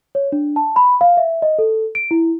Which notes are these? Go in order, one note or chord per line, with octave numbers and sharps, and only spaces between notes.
C#5
D4
A5
B5
F5
E5
D#5
A4
D7
E4